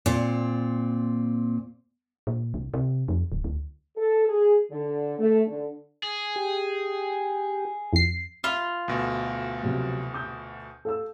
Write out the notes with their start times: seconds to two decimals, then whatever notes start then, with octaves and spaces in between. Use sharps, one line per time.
0.06 A#2 C4
2.27 A#2
2.54 C2
2.74 C3
3.08 F2
3.32 D1
3.44 D2
3.97 A4
4.28 G#4
4.71 D3
5.18 A3
5.47 D3
6.03 G#4
6.36 G4
7.93 F2 C7
8.44 F4 B5
8.88 D2 B2
9.63 C3 F3 F#3
10.14 D6 D#6 G6
10.85 A4 F5 E6